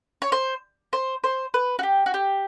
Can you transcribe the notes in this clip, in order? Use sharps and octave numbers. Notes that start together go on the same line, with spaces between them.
C#5
C5
C5
C5
B4
F#4
G4
F#4
G4